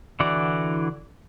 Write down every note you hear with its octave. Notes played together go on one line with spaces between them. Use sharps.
D3 E3 E4 F#4 D5